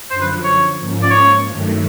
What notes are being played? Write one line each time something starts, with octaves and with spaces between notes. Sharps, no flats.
F#2 D3 F3 C5
B4
C#5
G#2 F3 A#3 C#4
D5
C#5
G2 D#3 F#3 A3